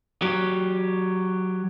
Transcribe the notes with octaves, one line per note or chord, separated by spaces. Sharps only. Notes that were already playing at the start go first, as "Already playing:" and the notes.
F#3 G4